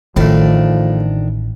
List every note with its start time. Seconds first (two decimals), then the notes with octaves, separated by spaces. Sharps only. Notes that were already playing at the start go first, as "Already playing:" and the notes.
0.16 A1 A2 D#3 F3 A3 D4